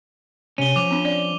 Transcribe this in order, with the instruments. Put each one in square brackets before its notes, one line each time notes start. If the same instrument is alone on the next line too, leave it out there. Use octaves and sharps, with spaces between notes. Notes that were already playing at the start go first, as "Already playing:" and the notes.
[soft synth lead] C3 [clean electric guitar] C#4 [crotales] D#7 G7
[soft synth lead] F3 [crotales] D6 F7
[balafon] C4 D4
D5